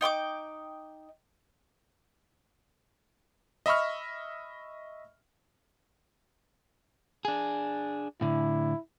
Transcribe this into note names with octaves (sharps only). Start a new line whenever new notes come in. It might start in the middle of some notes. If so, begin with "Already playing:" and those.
D#4 G5 C#6 D6
D#5 E5 B5 C#6 F6
D4 G#4
A2 D3 E4